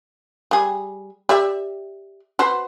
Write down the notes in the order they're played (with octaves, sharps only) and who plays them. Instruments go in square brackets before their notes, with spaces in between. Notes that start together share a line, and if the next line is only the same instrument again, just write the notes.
[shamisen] G3 G#4
G4 D5 E5
F#4 B4 C5